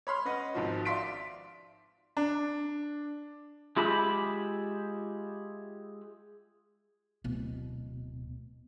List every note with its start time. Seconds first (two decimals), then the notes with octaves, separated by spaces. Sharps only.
0.07 C#5 B5 C6 F6
0.25 C#4 B4 D#5 F#5
0.54 G#1 G#2 F3 F#4
0.85 D5 E5 F5 C6 B6 D7
2.17 D4
3.77 G#3 F4 G4 E5 B5
7.24 D1 B2